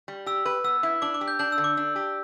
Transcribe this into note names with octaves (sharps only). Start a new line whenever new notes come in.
G3
G4 E6
B4
B3 E6
E4
D4 D6
D6
G4
G6
D4 G6
E6
D3
D6
D4
G4